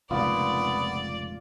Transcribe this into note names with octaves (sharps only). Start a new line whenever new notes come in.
F1 C#2 A#2 B3 F4 D5